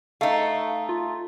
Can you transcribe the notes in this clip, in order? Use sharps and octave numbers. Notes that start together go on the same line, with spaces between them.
A3 D#4 F5
F4